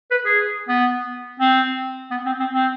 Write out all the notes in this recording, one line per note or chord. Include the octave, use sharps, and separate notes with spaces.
B4
G#4
B3
C4
B3
C4
C4
C4